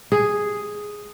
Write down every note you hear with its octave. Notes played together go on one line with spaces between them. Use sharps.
G#4